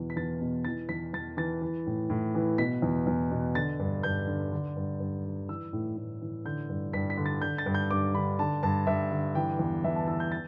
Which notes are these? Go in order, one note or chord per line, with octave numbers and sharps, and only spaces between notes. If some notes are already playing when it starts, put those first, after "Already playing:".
Already playing: E2 B2 E3
B6
E2 A6
B2
E3 A6
E2 B6
E2 A6
E3 A6
E3
A2
A2
E3
B2 B6
E2
E2
B2
D3 A6
G2
G2 G6
D3
D3
G2
G2
D3
E3 E6
A2
A2
E3
D3 G6
G2
G2 B6
B6
D3
A6
D3 G6
A6
G2
G6
G2 D6
D3 B5
D3 A5
G2 A5
G2 E5
D3
E3 G5
E2
E2 E5
A5
E3 E6
G6
A6